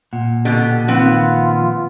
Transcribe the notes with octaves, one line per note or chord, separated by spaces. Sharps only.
A#2 F#5
B2 D3 G4
D#3 F3 B3 C4 F4 F#5